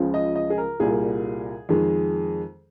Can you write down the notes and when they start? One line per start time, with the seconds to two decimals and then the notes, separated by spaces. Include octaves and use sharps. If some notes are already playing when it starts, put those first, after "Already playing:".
Already playing: C#2 C#3 F3 G#3
0.14 D#5
0.35 D#5
0.50 G#4
0.57 A#4
0.80 C2 A#2 G3 A#3 G#4
1.69 F2 D#3 G#3